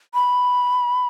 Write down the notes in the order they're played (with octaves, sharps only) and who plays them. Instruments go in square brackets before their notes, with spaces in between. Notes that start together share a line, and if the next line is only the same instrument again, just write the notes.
[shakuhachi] B5